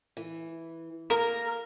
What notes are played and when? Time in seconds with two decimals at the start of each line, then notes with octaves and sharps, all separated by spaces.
0.17 E3
1.10 A#3 A#4